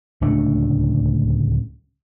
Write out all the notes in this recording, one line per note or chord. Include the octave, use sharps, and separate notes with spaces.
D1 C#2 A3 D4